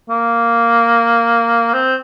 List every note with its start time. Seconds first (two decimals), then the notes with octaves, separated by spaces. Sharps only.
0.09 A#3
1.73 C4